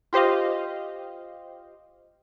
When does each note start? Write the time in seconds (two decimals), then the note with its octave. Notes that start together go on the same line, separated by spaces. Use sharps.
0.13 F4 G4 C5 D#5 F5